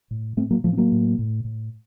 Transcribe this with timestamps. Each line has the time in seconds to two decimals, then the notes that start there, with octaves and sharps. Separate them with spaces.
0.11 A2
0.37 A2 A3 C4
0.51 F#3 A#3
0.64 A2 F3 A3
0.73 C4
0.77 F#3 A#3
0.92 A2
1.19 A2
1.45 A2